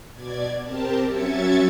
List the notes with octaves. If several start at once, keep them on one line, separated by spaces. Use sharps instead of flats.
B2 D5 G#6
C4 G4 A#4 A5
F#3 C#4 E5 G#6 A6 C#7